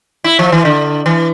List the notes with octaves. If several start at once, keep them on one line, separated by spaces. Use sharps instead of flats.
E4
F3
E3
D3
E3